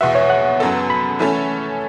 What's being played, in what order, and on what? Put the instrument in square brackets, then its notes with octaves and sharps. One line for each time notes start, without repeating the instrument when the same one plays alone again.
[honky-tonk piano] E2 B2 B3 F#4 [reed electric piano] E5
[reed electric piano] C#5
F#5
[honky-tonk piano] F#2 F#3 B3 A4
[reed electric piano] B5
[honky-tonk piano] E3 A3 C#4 A4 C#5